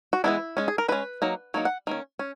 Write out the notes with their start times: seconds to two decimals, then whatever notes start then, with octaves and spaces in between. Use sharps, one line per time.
0.13 F#4
0.24 E3 G#3 B3 E4
0.57 G#3 C#4
0.68 G#4
0.78 A#4
0.88 G#3 C#4 B4
1.22 F#3 A#3 D#4
1.54 F#3 A#3 D#4 C#5
1.65 F#5
1.87 D#3 A#3 C#4
2.19 C#4